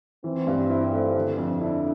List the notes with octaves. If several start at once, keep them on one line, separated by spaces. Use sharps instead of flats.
E3 C4
G2
E4
A3
D3
F2
D4 E4